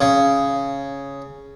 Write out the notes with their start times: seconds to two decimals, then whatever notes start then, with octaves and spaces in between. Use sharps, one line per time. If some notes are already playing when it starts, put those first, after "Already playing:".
0.01 C#3